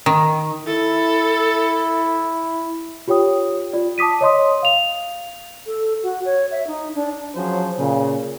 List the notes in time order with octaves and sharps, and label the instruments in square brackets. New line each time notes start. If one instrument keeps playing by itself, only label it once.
[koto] D#3
[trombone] E4 [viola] A4
[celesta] F4 G4 C#5 G5 D#6
F4 D5
A5 D6 D#6 B6 D#7
C#5 D#5 C6 D#6
F5 F7
[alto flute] A4
F#4
C#5
E5
D#4
D4
[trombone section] F3 F#3 C#4 G#4 C5
A#2 C#3